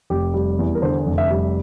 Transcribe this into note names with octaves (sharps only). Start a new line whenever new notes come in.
F1 G4
G3
E2
A#4
D3 C5
F1
E5
G3